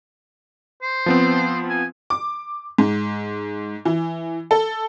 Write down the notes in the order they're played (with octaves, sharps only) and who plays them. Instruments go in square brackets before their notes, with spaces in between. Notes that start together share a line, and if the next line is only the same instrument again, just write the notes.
[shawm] C5
[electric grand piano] F3 B3 C4
[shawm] G#5
[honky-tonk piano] D6
G#2
E3
A4